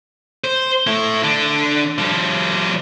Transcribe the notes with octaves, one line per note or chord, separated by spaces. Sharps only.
C5
A3 E4
D3 D4
F3 G3